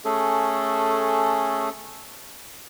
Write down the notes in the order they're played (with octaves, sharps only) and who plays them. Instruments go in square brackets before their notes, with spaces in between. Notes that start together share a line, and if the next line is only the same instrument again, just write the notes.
[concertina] A3 C#4 G#4 A4